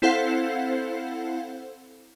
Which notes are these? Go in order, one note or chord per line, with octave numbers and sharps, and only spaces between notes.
C4 E4 A4 C5 F5 F#5